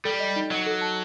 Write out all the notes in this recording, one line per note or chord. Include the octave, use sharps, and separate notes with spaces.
G3 A4
D#5
D#4
F#3 D#5
A4
A5